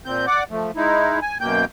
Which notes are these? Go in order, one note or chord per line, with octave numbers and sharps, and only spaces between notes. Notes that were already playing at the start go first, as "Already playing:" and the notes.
A#2 C4 G6
D5 F#5 D6
F3 A3
G#3 D#4 E4
G#5
F#2 B2 A#3 G5 G6